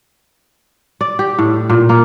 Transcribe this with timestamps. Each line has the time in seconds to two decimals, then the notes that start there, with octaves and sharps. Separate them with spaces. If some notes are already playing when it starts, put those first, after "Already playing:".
1.01 D5
1.19 G4
1.39 A2
1.70 A#2
1.89 A#3